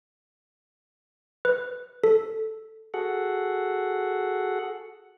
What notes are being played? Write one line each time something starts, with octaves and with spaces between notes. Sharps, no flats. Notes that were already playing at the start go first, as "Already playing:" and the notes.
B4
A4
F#4 G#4 A4 F#5